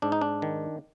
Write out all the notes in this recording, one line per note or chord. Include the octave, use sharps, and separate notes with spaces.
G#2 D4
D#4
D4
D#3